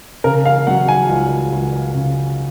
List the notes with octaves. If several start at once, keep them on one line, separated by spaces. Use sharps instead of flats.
C#3 A#4
F5
F#3 F#5
G#5
C#2
C#2
C#3